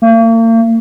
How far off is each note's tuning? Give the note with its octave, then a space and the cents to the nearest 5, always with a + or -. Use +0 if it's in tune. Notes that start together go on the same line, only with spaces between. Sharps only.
A#3 -45